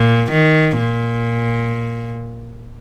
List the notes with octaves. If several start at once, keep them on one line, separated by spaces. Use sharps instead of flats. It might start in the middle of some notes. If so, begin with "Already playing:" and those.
Already playing: A#2
D#3
A#2